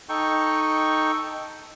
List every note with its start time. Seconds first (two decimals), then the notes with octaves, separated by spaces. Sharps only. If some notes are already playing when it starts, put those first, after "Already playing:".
0.09 D#4 A4 G5 C#6